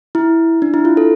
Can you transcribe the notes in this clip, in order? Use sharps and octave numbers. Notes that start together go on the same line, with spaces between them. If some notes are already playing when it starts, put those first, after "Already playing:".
E4
D4
E4
F4
A4